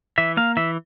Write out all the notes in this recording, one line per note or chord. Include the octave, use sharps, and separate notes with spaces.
E3 E5
A#3 F5
E3 E5